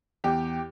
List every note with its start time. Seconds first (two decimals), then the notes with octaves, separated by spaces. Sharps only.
0.24 E2 G4